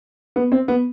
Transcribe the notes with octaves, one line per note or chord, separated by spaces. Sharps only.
B3
C4
B3